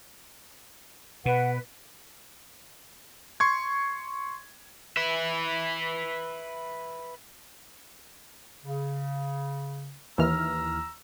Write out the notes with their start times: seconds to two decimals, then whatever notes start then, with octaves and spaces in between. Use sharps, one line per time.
1.26 B2 B4 F#5
3.40 C6 C#6 G#6
4.97 B4 E5
8.65 C#3
10.18 D#2 E3 A#5 E6 F6